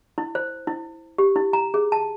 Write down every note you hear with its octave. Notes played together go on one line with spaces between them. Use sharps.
E4
C5
E4
G4
E4
A#5
G#4
A5